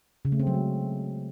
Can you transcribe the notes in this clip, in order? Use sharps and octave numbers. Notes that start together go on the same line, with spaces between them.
C#3
A3
C4
F#3
G#3